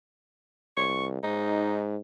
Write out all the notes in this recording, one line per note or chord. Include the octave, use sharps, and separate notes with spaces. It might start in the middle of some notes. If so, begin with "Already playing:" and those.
C2 C#6
G#2 D#4